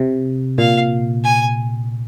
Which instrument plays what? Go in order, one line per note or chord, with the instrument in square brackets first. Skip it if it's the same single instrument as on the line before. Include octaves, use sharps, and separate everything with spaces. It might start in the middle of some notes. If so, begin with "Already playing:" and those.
Already playing: [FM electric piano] C3
[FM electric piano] A#2 [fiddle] F5
[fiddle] G#5